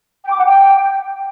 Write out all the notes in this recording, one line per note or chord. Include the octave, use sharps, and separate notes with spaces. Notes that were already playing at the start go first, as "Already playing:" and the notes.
G5
D6
F#5
G5